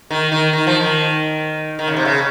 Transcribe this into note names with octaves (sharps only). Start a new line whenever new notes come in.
D#3
D#3
D#3
F3
D#3
D#3
C#3
C3
C#3